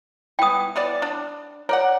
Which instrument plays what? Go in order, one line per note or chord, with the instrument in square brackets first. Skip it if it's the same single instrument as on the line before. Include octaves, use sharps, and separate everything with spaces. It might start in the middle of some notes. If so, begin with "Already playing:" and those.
[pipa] B3 E4 [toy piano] G5 D#6
[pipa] E3 B3 D5
D4
[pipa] A#4 D5 F#5 [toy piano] C#5